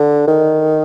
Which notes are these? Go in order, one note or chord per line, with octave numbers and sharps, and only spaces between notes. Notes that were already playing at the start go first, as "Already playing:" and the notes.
Already playing: D3
D#3